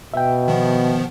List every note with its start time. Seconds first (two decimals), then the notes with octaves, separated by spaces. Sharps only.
0.14 B2 E5 G5
0.48 D#3 F3 B3